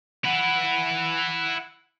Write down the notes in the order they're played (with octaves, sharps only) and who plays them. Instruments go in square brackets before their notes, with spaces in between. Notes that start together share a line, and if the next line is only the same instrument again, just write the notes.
[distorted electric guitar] E4 B4 [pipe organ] F#5